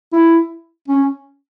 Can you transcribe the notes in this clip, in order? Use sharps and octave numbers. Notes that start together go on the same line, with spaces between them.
E4
C#4